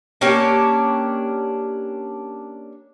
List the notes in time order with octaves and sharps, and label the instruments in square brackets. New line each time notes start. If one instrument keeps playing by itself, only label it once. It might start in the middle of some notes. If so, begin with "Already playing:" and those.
[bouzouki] A#3 C#4 D4 G4